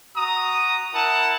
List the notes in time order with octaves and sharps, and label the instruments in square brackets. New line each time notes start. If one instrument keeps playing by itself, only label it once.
[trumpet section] F#4 A#5 D#6
E4 A#4 F#5 A5